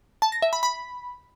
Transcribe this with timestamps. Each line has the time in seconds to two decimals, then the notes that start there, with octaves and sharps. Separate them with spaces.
0.22 A5
0.32 A#6
0.42 E5
0.53 B5
0.63 B5